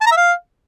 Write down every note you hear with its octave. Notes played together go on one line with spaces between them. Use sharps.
A5
A#5
E5
F5